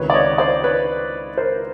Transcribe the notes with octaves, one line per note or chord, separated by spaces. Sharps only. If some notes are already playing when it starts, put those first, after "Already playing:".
Already playing: C#2 C3 D#3 B4 C#5
D5
C#5 D#5
C5 D5
B4 C#5
A#4 C5